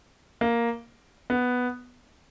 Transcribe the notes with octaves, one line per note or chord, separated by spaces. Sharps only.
A#3
B3